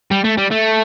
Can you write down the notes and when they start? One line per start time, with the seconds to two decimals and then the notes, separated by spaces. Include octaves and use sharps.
0.11 G3
0.24 A3
0.38 G3
0.51 A3